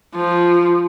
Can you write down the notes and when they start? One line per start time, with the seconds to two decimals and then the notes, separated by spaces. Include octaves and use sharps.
0.15 F3